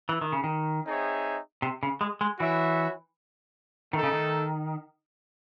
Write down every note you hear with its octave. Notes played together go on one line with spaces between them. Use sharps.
E3
D#3
C#3
D#3
C4 D#4 G#4 C#5 E5
C3
C#3
G#3
G#3
E3 F#4 C#5 E5
D#3 A3 D#4 A4
C#3
D#3